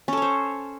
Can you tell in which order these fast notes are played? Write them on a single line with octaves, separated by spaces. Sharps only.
C#4 A4 C#5 C5